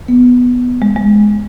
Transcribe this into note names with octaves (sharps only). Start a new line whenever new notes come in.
B3
G#3
G#3